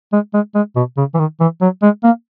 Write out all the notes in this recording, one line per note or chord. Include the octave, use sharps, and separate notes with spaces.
G#3
G#3
G#3
B2
C#3
E3
D#3
E3
F#3
G#3
A#3